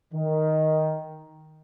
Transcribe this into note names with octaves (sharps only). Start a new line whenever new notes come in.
D#3